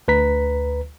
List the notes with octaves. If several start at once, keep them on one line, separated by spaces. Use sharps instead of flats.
D2 B4 A#5 B6